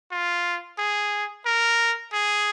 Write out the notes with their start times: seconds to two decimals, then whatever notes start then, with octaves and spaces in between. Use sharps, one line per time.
0.11 F4
0.78 G#4
1.46 A#4
2.13 G#4